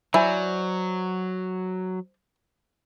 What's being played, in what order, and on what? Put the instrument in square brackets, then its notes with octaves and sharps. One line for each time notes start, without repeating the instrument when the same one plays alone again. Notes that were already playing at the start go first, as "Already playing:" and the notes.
[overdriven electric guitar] F#3 [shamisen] E4 [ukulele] C5 D5 G#5